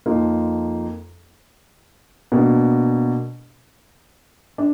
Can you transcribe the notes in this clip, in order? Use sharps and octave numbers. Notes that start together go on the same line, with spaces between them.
F2 F3 A#3 D#4
B2 A#3 D4
D4